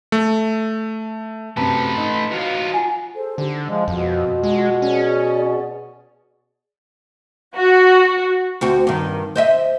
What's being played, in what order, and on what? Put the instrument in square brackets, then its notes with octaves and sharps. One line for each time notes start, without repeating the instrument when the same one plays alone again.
[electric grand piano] A3
[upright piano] F#2 C3 [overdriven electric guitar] A3 B4 [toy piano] A5 A#5
[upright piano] D#4
[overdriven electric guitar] F#3 F4
[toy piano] F4 F#5 G#5
[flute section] G#4 A4 C5
[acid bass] D3 [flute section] D#4 G4
[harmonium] F3 G#3 [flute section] F4
[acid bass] F2 [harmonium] B2
[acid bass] G#3
[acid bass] C#4 [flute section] G#4 C#5 D5
[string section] F#4
[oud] D2 C4 F#4
G2 D#3
C5 D#5 E5